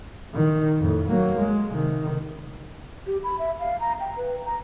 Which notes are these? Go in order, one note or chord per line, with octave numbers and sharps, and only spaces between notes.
D#3
F2 A2
F#3 A#3
G#3
C3 D#3
G4
B5
E5
F5
A#5
G5
B4
A#5